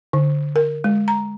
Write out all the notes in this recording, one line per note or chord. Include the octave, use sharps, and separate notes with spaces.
D3
A#4
G#3
A#5